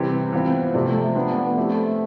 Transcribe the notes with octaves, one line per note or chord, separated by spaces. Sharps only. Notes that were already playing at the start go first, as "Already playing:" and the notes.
Already playing: C3 E3 G3 C4 G4
E3 B3 C4 F4 C5
C3 F3 A3 C4 G4 D5
F3 A3 B3 D4
A3 C4 E4 G4 C5